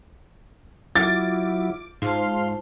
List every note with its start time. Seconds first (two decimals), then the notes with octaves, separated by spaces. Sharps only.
0.96 F#3 E4 F4 D6 A6
2.02 G#2 F4 C5 F5 A5 C6